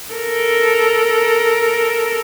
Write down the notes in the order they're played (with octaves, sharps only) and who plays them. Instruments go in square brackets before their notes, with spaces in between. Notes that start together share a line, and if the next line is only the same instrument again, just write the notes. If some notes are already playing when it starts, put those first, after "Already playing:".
[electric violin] A4 A#4